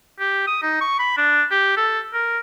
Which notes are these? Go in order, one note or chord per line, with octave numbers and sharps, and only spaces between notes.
G4
D#6
D#4
C#6
B5
D4
G4
A4
A#4